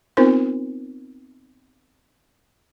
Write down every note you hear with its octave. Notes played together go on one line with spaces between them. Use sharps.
B3 C4 D#4 F4 A#4 C5